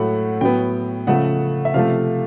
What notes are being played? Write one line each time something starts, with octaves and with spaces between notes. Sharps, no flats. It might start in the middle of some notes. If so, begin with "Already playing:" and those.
Already playing: A2 F#3 A3 F#5
A2 F#3 B3 G5
C#3 F3 A3 F#5
E5
C3 F3 A3 F5